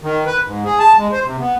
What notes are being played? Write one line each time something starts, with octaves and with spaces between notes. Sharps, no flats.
D#3
B4
G#2
G#4
A5
G#3
C5
C3
B3